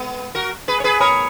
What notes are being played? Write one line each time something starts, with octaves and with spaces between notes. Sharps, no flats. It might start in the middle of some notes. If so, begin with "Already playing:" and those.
Already playing: G#3 B3
F#4 A#4
G#4 B4
C#5
G#4 B4
A#4 C#5 B5 D#6